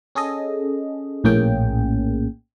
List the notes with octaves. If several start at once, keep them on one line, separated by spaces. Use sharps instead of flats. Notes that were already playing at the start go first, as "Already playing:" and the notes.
C#4 G#4 A4 D#5
A#1 A2 A#3 C#4 G#4 G5